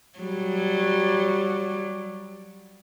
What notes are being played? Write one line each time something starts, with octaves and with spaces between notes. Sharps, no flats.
F#3 G3